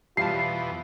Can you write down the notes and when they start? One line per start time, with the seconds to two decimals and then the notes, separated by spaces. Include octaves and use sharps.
0.17 F2 B2 E3 G3 F4 F5 A5 C7